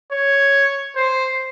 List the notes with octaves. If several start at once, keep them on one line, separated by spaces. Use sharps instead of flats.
C#5
C5